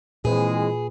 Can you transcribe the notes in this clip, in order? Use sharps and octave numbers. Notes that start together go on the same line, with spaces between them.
A#2 E3 G#3 C4 G#4 B4